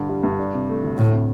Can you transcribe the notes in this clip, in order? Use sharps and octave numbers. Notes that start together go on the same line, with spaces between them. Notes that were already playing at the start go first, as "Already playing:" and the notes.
Already playing: G2 D3
G3
G2
D4
C3
A3
D2
D2 A2
C3